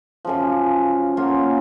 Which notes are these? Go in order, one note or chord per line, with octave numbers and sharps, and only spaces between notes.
F#2 C#3 F3
F#3 A#3 C#4 F4